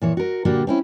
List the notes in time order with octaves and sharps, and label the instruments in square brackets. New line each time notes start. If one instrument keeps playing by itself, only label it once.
[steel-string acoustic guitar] A#2 E3 C#5
F#4 A#4
A#2 D3 G3 A#3 F#4 G4
C4 C#4 E4